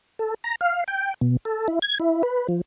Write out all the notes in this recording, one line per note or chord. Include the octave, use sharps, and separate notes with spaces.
A4
A#5
F5
G5
B2
A4
E4
G#6
E4
B4
F3